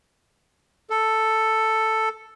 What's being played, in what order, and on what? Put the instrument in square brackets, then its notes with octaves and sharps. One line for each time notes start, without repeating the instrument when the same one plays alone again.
[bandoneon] A4